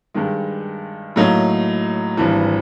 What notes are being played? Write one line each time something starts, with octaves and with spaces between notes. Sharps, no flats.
G2 D#3 G#3
A2 F#3 A#3 D#4
G#1 G2 E3